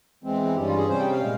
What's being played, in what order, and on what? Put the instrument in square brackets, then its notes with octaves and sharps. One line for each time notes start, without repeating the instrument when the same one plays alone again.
[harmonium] E2 E3 G#3 C4
E4
G2 G3 C#4 G4
F4
G#4
C3 G3 C#4 C5
G5
F5
A#2 G#3